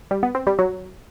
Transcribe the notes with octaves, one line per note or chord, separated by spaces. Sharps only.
G3
B3
C4
G3
F#3